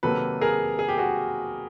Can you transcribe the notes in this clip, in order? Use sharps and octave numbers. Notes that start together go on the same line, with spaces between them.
C3 D#3 F#3 A#3 A4 B4
G#4 A#4
G#4
G4
F#4 G#4